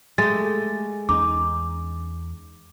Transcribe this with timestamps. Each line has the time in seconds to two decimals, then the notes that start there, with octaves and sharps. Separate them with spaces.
0.18 G#3 A3 G4 A6
1.09 E2 C#4 D#4 D6